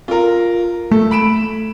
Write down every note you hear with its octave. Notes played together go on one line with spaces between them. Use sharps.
F4 A#4
A3 A4
B5 D7 E7